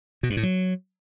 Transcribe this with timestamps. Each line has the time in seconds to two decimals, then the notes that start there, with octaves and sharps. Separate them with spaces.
0.23 B2
0.30 G2
0.37 A2
0.43 F#3